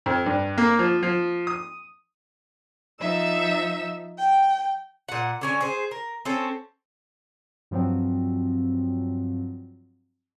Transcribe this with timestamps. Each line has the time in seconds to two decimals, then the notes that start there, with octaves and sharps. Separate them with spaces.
0.06 F2
0.26 G2
0.58 A#3
0.79 F3
1.03 F3
1.47 D#6
3.01 F3 D#4 E5 E6
4.19 G5
5.08 A#2 F#5
5.41 D3 C#4 G#5
5.60 G#4 C5
5.91 A#4
6.25 C4 C#4 A4
7.71 G2 F3 F#3 C4